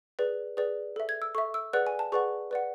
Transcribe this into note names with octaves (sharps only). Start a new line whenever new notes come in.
G#4 B4 D5
G#4 B4 D5
A4 E5
G#6
E6
A4 E5 C#6
E6
G#4 B4 D5 F#5 F#6
G#5
A5
G#4 B4 D5 F#5 C#6
B4 D5 F#5